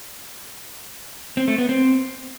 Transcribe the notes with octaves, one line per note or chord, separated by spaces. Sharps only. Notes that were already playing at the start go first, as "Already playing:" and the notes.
C4
A3
B3
C4